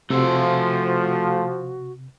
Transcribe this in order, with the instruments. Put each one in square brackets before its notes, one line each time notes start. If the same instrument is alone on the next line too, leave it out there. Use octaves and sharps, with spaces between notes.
[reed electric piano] C3 E6 [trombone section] F3 [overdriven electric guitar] A3 C5 [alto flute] F#4